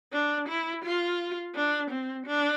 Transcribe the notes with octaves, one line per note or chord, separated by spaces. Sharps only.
D4
E4
F4
D4
C4
D4